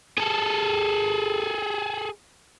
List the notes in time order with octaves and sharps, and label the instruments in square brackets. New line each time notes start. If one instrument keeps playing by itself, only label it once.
[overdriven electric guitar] G#4 A4